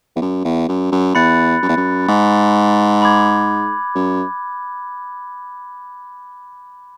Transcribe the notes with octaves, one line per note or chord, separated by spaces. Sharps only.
E2
F#2
E2
F#2
F#2
E2 B5 F#6 A6 C#7
F#2
E2
F#2
G#2
B5 D6 G#6
F#2